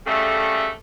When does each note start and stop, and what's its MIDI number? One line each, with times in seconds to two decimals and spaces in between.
0.06 0.71 49
0.06 0.71 55
0.06 0.71 57